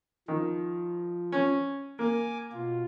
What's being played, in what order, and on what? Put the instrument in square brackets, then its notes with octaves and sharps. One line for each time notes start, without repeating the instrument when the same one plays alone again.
[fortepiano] D#3 [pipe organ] F3
[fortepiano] C#4
[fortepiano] A#3 [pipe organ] G#5 D6
[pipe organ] B2 F4